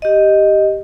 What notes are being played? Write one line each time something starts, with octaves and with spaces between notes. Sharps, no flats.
G4 D#5